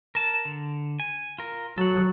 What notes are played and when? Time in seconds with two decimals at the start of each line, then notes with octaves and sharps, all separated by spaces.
0.15 A#4 A5
0.45 D3
1.00 G#5
1.38 F4 A#4
1.78 F#3 A4 F#5